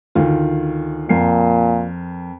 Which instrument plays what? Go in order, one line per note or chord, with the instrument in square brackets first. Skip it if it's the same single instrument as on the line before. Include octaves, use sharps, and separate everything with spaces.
[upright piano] D2 D#3 F4
[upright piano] F2 A#4 C7 [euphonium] A#2